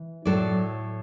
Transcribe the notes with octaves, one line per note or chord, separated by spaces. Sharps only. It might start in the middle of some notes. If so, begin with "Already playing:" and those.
Already playing: E3
A2 F#3 A4 D5